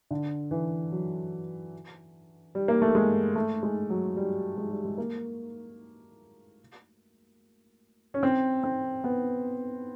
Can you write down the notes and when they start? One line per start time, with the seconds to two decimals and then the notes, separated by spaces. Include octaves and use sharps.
0.11 D3
0.51 E3
0.92 F#3
2.55 G3
2.68 A#3
2.82 A3
2.95 G#3
3.36 A3
3.63 G#3
3.90 F#3
4.17 G3
4.57 G#3
4.71 G3
4.85 G#3
4.98 A#3
8.14 C#4
8.23 C4
8.63 C4
9.04 B3